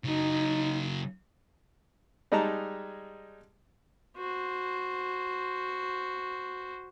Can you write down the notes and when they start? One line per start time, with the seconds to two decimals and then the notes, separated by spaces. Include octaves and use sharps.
0.05 C#3 F#3 D#4
2.32 G3 G#3 D#4 G#4 A5 A#5
4.17 F#4 C5